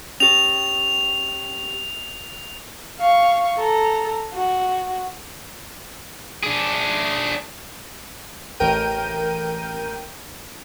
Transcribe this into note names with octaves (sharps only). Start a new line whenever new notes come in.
C#4 G4 F7
F5 C#6
A4 A#5
F#4
D4 G#4
A1 A#4 G5 G6 D#7